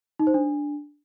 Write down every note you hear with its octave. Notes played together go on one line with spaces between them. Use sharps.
D#4
C5
D4